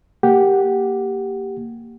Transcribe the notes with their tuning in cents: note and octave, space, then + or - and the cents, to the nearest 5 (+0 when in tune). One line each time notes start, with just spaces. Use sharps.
A#3 -10 G4 +0 F#5 +0